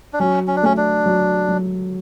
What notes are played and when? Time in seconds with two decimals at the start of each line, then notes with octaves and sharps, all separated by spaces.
0.13 D4
0.19 F#3 C#4
0.47 C#4
0.56 D4
0.63 A3 C#4
0.77 D4
1.06 F#3
1.48 F#3